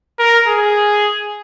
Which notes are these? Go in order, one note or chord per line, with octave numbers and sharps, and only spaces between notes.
A#4
G#4